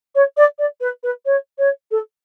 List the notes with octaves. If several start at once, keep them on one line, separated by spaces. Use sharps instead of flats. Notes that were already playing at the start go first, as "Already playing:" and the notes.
C#5
D5
D5
B4
B4
C#5
C#5
A4